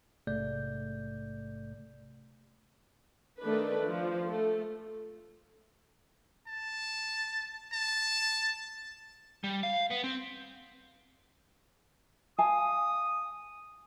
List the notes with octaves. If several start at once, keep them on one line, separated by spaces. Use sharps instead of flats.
A#1 G#2 C3 A3 D5 G6
D#3 A3 D4 B4
F3
A3
A5
A5
G3
F5
B3
C4
F5 G#5 A5 D#6